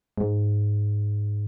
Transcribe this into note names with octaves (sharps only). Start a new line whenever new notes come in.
G#2